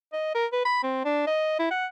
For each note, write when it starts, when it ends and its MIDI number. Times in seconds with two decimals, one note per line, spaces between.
0.13 0.31 75
0.35 0.46 70
0.53 0.65 71
0.65 0.83 83
0.83 1.00 60
1.05 1.26 62
1.27 1.57 75
1.59 1.66 64
1.71 1.86 78